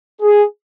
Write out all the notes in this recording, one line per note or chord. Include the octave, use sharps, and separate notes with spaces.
G#4